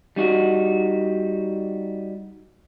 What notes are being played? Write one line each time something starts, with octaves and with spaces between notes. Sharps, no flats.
G3 D#4 F#4